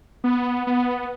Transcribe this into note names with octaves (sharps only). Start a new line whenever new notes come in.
B3
B3